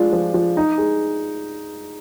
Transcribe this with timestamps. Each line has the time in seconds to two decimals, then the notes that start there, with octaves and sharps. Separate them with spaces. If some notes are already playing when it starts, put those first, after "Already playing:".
Already playing: F3 G#3 D4 F4
0.13 F3
0.34 F3
0.57 D#4
0.78 G#4